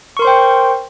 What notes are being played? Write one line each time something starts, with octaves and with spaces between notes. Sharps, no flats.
A#4 C5 G5 C6 C#6